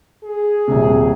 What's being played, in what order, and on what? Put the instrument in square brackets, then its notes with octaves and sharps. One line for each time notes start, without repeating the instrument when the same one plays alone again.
[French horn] G#4
[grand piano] D#1 C3